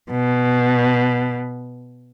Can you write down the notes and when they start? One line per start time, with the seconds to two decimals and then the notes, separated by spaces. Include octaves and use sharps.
0.11 B2